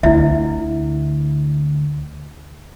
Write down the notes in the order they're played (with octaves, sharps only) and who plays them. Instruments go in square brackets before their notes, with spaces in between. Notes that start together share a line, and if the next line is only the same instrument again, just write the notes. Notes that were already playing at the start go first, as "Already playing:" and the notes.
[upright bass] D2 [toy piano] E4 E5